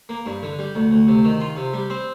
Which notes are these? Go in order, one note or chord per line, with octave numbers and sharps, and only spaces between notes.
A#3
G2
D3
G3
D2
D2
C3
D#3
F4
C3
G3
C4